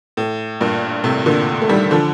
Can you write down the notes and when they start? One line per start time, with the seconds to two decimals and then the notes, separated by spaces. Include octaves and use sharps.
0.17 A2
0.61 G2 A#2
1.04 A2 C3
1.26 A#2 D3
1.62 A3
1.69 D#3 G3
1.91 D3 F3